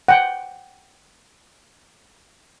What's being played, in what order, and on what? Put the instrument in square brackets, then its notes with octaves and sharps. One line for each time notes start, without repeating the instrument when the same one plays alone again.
[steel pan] F#5 G5